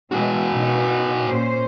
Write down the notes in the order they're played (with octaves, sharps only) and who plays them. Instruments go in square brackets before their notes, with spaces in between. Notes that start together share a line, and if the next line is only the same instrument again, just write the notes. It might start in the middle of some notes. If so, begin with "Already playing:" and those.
[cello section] B2 E3 G#3 [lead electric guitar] F#4 G#4
[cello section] B2 D#4
A#2 C#4 C5